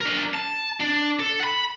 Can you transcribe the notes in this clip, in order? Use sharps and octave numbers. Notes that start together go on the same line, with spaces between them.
D4 A#4
A5
D4
A4
F#5 B5